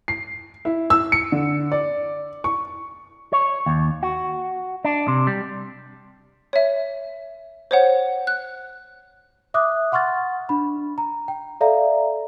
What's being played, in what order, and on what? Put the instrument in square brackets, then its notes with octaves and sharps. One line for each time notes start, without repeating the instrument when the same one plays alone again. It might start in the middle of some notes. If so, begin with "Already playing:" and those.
[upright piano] C7
E4
E6
C#7
D3
D5
C#6
[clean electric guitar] C#5
D#2
F#4
D4
C3
G3
[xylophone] C#5 E5
C5 C#5 F#5
F#6
[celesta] E5 D6 D#6 F#6
F#5 C6 C#6 F6 A6
D4 B5
A#5
G5
A4 D5 E5 F5 A#5